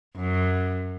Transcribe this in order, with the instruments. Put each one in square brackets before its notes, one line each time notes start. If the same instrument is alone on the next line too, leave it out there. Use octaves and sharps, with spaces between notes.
[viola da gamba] F#2